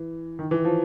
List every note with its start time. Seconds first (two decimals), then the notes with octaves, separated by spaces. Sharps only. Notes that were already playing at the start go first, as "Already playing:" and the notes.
Already playing: E3
0.39 D#3
0.51 E3
0.65 F3